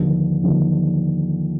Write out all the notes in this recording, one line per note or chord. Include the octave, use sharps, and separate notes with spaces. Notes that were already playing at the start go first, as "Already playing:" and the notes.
Already playing: D#2 D3 F3
D#2 D3 F3